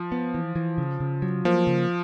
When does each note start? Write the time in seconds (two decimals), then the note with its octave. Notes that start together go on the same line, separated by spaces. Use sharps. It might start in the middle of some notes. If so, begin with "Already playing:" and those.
Already playing: F3
0.12 B3
0.35 E3
0.56 E3
0.78 C#3
1.00 C#3
1.22 F#3
1.45 F3 A#3
1.67 C#3